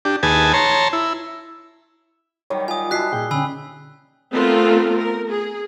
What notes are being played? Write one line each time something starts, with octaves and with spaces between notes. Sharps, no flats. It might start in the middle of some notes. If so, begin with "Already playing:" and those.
D4 G4
D#2 G#4 B4 G#5 A5
C#5 A5 A#5 C6
E4
D#3 F#3 G3 C#5
F4 G#5 D#6
E4 F#4 D#5 A5 F#6 B6 C7
A#2 A#3 G#4 G5
D3 C#4 G#5 B5 E6
A3 B3 C4 F4 A4 A#4
A#4
G#4